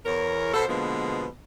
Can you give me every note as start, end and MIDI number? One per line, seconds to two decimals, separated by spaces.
0.05 0.52 40
0.05 0.52 70
0.05 0.52 73
0.54 0.64 47
0.54 0.64 69
0.54 0.64 72
0.68 1.26 47
0.68 1.26 50
0.68 1.26 53
0.68 1.26 56
0.68 1.26 58
0.68 1.26 59